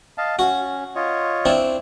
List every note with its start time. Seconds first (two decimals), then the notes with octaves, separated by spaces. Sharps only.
0.18 D#5 F5 A5
0.39 C#4 F#4
0.96 F4 C#5 D#5
1.45 C4 D4 E4